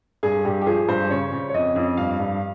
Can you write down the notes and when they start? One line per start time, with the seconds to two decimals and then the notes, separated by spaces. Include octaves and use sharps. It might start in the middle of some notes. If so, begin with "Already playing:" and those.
0.23 G2 G#4
0.45 G2 G4
0.62 G4
0.66 F3 G#4
0.88 G2 C5
1.10 C#3 C#5
1.32 C#3
1.49 C#5
1.54 F2 D#5
1.76 F2
1.97 G2 F5
2.20 G2